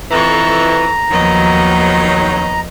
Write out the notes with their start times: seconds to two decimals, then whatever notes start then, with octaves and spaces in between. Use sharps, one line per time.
0.11 F2 E3 A4 A#5 C#6
1.11 D#2 D#3 F3 F#3 B3 D#5